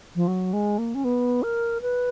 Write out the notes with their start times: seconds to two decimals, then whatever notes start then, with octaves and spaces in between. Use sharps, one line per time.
0.16 F3
0.27 F#3
0.53 G#3
0.78 A#3
0.95 C#4
1.04 B3
1.43 A#4
1.81 B4